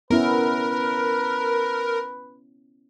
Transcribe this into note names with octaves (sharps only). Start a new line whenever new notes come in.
B3 C#4 E4 A#4 B4